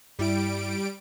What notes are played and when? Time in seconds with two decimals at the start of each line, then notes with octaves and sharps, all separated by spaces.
0.19 G2 G3 E4 D7